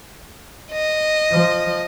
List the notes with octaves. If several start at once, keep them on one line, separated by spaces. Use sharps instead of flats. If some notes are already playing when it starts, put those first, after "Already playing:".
D#5
F3